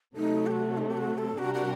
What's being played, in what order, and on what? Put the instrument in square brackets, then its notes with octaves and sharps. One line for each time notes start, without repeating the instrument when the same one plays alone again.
[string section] C3 F#3 A3 [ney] D#4
[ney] G4
F#4
D#4
G4
F#4
A4
[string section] C3 G3 D4 G4 A#4 [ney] F#4
[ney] F#4